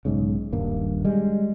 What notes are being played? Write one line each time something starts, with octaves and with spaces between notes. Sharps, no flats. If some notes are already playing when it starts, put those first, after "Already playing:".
B1 G#2 C#3
D#1 G2 A#3
G3 G#3